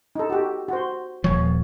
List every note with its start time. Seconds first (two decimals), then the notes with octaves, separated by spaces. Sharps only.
0.16 D#4 A4
0.30 F#4 G4
0.68 F#4 C5
1.24 D#1 F3 C#5